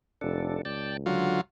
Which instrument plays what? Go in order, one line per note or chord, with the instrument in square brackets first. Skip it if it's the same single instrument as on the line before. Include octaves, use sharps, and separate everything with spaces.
[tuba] F1 [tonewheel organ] D4 A4
[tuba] C#2 [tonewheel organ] D5 G5 A5
[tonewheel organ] D3 [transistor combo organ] F#3 F4